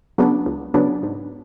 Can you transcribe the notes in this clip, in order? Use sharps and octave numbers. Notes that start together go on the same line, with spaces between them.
C#3 F#3 B3 D4
C#2
C#3 F#3 B3 D4
G#2